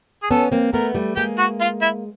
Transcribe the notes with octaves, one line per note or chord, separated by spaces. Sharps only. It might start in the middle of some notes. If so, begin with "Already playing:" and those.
G#4
B3 C#4 A4
A#3 C4
A3 B3 A#4
G3 A3
G#3 A#3 G4
F#4
F4
E4